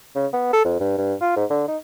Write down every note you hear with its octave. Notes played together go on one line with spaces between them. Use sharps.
C#3
B3
A4
F2
G2
G2
F4
G#2
D3
D#4